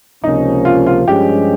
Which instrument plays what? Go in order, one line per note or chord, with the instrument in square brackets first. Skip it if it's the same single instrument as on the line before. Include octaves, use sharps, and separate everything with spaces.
[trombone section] C#2 C3 F3 A#3 C#4 [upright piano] D#4
[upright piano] F4
F4
[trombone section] G2 F3 G#3 C#4 [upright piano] G4